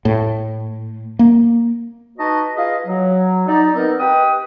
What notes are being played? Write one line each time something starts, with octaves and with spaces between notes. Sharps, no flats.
A2
A#3
D#4 F#4 B4 D#5 A5
F4 G#4 B4 D#5
F#3
D#4 D5
B3 C4 D#4 A#4 D#5
G4 B4 D#5 G5 D#6